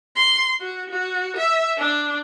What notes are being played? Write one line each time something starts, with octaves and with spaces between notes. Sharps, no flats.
C6
F#4
F#4
E5
D4